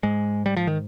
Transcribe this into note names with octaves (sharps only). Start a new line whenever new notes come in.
G#2 G#3
G3
F3
D#3